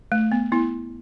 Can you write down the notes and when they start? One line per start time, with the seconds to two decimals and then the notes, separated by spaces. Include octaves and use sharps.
0.12 A3
0.32 B3
0.52 B3 E4